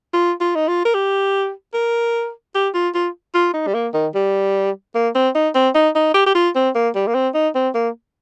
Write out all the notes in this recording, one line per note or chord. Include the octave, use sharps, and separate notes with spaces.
F4
F4
D#4
F4
A#4
G4
A#4
G4
F4
F4
F4
D#4
G3
A#3
D#3
G3
A#3
C4
D#4
C4
D#4
D#4
G4
G4
F4
C4
A#3
G3
A#3
C4
D#4
C4
A#3